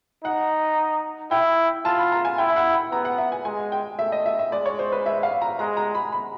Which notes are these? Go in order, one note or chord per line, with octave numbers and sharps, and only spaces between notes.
D#4 F#5
E4 G5
F4 A5
B5
A#5
G#5
E4 G5
F#5
B5
B3 A#5
F#5
E5
G#5
G#3 G#5
G5
A3 E5
D#5
E5
E5
G#3 D5
C#5
C5
B4
E5
F5
A#5
G#3 A#5
A#5
B5
B5